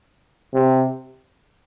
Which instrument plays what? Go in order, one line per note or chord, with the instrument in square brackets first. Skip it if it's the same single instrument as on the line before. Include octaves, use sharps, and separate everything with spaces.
[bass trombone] C3